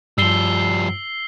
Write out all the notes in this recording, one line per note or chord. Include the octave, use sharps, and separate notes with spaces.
G2 F3 G3 E6 C7 G7